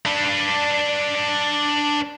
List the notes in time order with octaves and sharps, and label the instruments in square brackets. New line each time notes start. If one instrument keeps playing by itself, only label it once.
[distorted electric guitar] D4 B4